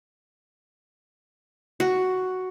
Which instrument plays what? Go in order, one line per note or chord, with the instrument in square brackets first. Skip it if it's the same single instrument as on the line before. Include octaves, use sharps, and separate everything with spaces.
[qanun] F#4